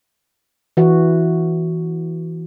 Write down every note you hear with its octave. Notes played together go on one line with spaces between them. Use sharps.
E3 F#4